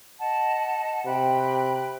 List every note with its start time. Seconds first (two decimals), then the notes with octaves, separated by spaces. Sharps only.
0.20 D#5 F#5 A5
1.06 C3 G5 B5 F#6